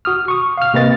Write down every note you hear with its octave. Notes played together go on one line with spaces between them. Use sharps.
F#4 D#6 F6
C#6 D#6
F5 F6
C3 A#3 C4 B4 D#5 A6